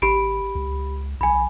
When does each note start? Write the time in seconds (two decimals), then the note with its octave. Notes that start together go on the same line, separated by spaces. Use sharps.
0.02 G#1 G4 B5 D7
0.55 C#2
1.21 B1 G#5 B5